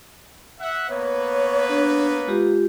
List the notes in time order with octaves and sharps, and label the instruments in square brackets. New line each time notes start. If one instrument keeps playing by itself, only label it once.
[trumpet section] E5 F#5
[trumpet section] A#3 B3 B4 [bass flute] C#5
[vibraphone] D4
G#3 F4 G4